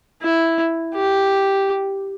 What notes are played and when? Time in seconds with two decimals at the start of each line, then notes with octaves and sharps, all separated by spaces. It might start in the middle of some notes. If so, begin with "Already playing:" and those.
0.22 E4
0.95 G4